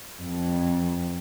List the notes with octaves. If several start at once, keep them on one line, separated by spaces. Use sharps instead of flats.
F2